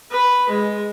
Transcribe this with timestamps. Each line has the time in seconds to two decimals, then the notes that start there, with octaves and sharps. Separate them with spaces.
0.10 B4
0.49 G#3